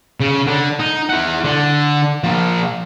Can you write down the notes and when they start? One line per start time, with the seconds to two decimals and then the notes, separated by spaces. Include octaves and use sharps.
0.20 C#3
0.47 D3
0.80 D#4
1.10 E4 F#5
1.45 D3
2.24 F3 A#3